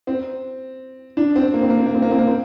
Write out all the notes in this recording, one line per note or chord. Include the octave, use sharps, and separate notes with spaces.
C4
D4
C4
A#3
C4
A#3
C4
A#3
C4
A#3
C4
A#3
C4